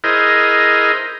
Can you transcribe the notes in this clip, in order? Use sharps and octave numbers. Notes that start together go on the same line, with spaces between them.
E4 G#4 A#4 C5 D#5